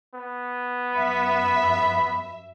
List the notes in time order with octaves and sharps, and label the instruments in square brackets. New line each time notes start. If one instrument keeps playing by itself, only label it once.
[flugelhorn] B3
[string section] F#2 E5 [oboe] B5